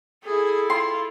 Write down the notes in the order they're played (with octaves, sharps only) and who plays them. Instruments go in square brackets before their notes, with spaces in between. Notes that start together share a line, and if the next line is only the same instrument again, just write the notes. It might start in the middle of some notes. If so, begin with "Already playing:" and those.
[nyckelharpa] E4 A4 [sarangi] G#4
[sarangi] F4 [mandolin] C6